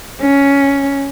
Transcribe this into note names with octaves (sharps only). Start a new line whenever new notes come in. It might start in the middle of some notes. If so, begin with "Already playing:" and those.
C#4